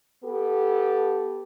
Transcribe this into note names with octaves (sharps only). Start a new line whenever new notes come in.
B3 G4 A4